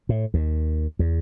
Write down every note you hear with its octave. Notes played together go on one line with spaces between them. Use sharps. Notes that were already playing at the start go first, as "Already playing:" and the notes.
A2
D#2
E2